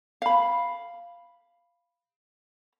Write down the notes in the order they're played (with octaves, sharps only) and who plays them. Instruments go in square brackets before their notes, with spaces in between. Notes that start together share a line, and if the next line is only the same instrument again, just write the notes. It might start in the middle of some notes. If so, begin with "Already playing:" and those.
[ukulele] F5 B5